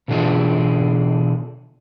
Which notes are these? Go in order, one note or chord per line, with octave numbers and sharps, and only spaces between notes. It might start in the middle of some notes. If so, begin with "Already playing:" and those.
B2 D3 E3 D4 F4 G#4